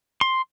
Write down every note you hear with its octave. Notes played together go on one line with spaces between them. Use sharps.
C6